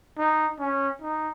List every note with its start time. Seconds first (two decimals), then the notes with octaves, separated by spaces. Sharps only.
0.18 D#4
0.59 C#4
1.02 D#4